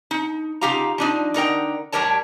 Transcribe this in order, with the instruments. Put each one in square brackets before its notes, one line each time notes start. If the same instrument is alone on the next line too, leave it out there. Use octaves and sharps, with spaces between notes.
[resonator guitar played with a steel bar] D#4
C#3 D#4 F4 G4 F5 A#5
F3 D4 D#4
D3 D#4 A#4 G5
A2 G3 G4 A#4 C#5 A5